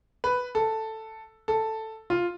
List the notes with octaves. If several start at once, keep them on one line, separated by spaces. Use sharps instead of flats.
B4
A4
A4
F4